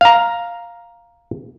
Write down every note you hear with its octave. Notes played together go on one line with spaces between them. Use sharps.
F5 A#5